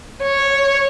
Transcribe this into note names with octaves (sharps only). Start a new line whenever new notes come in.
C#5